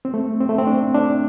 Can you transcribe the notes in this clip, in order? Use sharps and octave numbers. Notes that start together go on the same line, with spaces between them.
C4
A3
C4
A3
C4
D4
D4